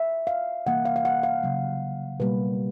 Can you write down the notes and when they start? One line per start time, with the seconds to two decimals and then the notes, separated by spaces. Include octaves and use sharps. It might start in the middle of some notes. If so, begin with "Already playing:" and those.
Already playing: E5
0.27 F5
0.66 C3 E3 G3 A#3 F#5
0.85 F5
0.96 F5
1.05 F#5
1.23 F5
1.43 C#3 F#3 A#3
2.20 B2 G3 A#3 B4